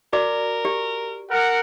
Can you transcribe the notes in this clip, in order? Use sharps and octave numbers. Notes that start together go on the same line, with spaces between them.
F#4 A#4 D5 D6
G4
A#4 F#5